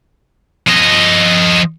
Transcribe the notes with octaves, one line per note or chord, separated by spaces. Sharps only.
F3 D#5